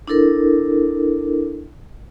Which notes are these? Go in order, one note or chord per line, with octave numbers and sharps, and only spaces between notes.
D4 E4 A4 A#4